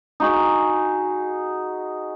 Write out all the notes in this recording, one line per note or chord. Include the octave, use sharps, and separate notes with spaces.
D#4 F#4 G#4